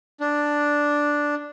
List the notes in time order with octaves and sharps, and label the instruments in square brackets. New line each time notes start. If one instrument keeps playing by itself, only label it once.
[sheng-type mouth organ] D4